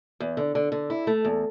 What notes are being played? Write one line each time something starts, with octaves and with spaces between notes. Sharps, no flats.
E2
D3
D3
D3
E4
A3
E2